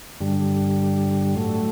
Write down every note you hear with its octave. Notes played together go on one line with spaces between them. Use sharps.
G2 D3 G3
A2 F#3 A3